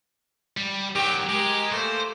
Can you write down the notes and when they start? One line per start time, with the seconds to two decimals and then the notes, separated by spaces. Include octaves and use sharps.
0.57 G3
0.95 D#3 F#3 G4 G5
1.29 G#3 G4 G#4 A#4
1.72 A3 A#3 C5